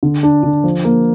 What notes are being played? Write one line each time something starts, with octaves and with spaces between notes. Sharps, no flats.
D3
D4
D3
F3
A#3